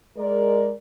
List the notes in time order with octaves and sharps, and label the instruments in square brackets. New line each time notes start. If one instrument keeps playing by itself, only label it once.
[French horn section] G#3 A#4 D5